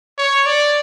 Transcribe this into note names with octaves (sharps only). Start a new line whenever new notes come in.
C#5
D5